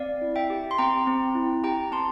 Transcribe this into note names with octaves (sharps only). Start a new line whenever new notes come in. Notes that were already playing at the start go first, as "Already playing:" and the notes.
Already playing: C4 D5 F5
E4
E5 G5
G4
C6
C4 G5 A#5
C4
E4
G4 G5 A#5
C4 A5 C6